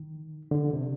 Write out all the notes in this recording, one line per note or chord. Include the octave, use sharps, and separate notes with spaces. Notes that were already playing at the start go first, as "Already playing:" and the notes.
Already playing: D#3
D3
C3